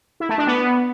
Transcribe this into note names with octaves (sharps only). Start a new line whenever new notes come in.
E4
A3
D4
B3